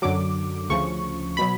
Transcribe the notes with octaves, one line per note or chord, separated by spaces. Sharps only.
F#2 D3 F#3 D6
D2 C#3 F3 C#6
B2 F#3 B5